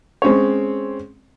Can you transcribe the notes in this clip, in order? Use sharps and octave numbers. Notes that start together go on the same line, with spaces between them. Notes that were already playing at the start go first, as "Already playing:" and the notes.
G#3 C4 C#4 C#5